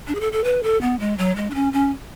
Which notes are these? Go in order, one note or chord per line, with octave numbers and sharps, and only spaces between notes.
D4
G#4
A4
A4
B4
A4
B3
G#3
F#3
G#3
D4
C#4
C#4